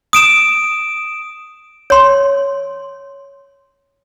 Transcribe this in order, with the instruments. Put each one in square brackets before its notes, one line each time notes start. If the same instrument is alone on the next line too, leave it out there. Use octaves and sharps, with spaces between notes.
[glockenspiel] D#6 D7 E7
[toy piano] C#5 C6